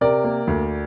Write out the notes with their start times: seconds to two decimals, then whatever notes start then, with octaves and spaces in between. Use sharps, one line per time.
0.01 C3 A#4 D5
0.24 A#3
0.47 D2